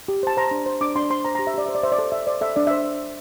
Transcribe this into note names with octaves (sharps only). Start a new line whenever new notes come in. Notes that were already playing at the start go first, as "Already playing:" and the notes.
G4
C5 A5
C5 A#5
D4
C5
D4 D6
D4 C6
C5 C6
C5 A#5
A#5
G4
E5
G4 D5
C5 E5
D5
C5 E5
D5
A4
C5 E5
C5 D5
A4 E5
D4 D5
E5
C5